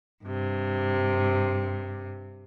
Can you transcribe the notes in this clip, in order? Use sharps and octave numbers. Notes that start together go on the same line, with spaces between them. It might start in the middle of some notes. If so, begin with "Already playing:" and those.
G2 C3